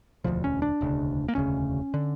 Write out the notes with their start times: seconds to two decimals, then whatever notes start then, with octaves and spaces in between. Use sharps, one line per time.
0.24 E1 D2 C#3 F3
0.44 C#4
0.62 D4
0.81 E1 D2 C#3
1.28 A#3
1.35 E1 D2 C#3 C#4
1.94 D3